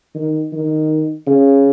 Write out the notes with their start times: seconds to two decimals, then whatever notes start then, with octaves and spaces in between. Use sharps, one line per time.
0.15 D#3
0.53 D#3
1.27 C#3